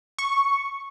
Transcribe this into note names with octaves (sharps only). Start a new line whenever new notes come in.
C#6